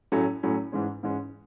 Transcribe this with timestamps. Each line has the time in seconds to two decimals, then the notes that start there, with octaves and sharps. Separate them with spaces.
0.12 A2 F#3 A3 C#4
0.43 A2 F#3 A3 C#4
0.72 G#2 E3 G#3 C#4
1.03 G#2 E3 G#3 C#4